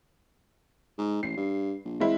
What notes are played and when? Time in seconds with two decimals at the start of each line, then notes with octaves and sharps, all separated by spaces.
0.98 G#2
1.23 A1 C7
1.37 G2
1.85 A#1
2.00 G#3 C4 E4